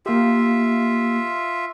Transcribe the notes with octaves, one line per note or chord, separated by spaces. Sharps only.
A#3 F4 G4 E5